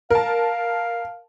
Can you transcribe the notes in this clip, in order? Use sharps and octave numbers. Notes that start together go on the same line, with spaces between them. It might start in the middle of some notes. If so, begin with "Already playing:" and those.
A#4 F5 A5